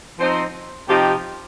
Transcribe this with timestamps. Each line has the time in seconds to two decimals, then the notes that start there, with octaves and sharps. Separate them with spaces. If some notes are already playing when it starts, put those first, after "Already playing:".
0.18 F3 C4 D#4 C5
0.88 C3 F3 D#4 G4